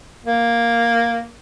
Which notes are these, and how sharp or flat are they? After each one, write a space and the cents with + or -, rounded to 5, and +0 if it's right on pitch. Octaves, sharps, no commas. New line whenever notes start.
A#3 +0